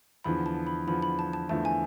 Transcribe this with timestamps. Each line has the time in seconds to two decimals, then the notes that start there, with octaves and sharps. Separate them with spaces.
0.24 E2 D3 F3 B5
0.46 A5
0.67 B5
0.87 E2 D3 F3 B5
1.02 B5
1.19 A5
1.33 A5
1.49 E2 D3 F3 A3 A5
1.65 G#5